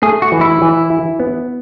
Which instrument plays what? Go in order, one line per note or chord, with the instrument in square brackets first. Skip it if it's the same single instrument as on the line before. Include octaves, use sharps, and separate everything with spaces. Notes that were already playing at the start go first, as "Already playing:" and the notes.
[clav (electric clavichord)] A3 [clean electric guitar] G#4
[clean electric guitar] F#4
[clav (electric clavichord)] E3
[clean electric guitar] E4
[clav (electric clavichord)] E3
E4
B3